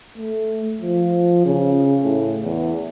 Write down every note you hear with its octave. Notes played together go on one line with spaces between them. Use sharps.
A3
F3
C#3
A2
E2